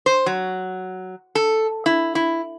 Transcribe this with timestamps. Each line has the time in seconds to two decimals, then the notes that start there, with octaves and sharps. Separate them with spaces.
0.06 C5
0.26 F#3
1.35 A4
1.86 E4
2.15 E4